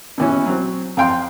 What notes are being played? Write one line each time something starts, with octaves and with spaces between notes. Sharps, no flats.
B2 E3 C#4
F#3 C4
F2 F5 G5 C6